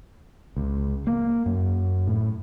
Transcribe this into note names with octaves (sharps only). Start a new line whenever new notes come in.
C#2
A#3
F#2
A2